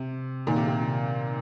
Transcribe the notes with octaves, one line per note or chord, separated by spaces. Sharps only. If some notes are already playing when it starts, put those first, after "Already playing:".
Already playing: C3
A#2 D#3
C3
C3